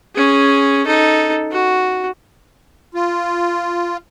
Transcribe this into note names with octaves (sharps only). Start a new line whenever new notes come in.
C#4 G#4
D#4 A4
F#4
F4